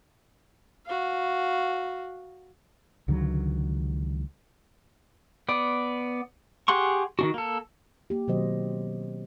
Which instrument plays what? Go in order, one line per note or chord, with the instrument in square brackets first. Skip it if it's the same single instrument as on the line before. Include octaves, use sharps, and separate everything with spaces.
[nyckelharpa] F#4 F5
[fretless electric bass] C#2 D3 D#3 F#3
[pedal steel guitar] B3 D5
G4 G#4 F#5 C6 C#6
D#3 D4 F#4
A#3 A4
[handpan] A#3 G4
B2 D#3 F#3 C4 C5 D#5